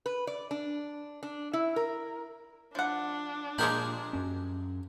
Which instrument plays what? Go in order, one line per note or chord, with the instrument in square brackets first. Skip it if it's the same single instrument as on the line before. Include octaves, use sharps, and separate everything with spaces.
[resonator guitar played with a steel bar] B4
D5
D4
D4
E4
A#4
[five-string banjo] F3 F#5 [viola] D4
[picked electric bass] A#2 [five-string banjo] F3 G#3 G4 [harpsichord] G#4 A#4 B5
[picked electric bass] F#2 C#4